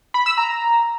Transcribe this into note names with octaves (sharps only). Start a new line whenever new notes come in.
B5
E6
A#5